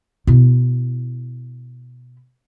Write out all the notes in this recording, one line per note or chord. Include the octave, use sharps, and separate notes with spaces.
B2 E4